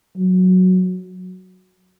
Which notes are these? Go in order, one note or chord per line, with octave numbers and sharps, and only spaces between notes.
F#3